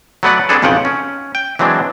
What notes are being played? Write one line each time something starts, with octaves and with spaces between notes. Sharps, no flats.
F#3 A3 B3 B4 D5 F#5
B3 C4 D4 G#4 A4
B1 F2 C#3 F3 F#5 G5
C#4
G5
E3 F#3 G#3 C4 D4